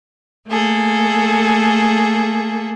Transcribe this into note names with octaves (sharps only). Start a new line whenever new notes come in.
A3 A#3 G#4 A4